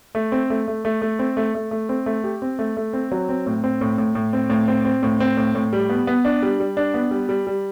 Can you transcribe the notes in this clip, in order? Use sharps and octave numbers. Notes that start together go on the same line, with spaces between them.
A3
C4
A3
A3
A3
A3
C4
A3
A3
A3
C4
A3
G4
C4
A3
A3
C4
F#3
C4
A2
C4
A2
A2
A2
C4
A2
C4
C4
A2
C4
A2
A2
G3
B3
B3
D4
G3
G3
D4
B3
G3
G3
G3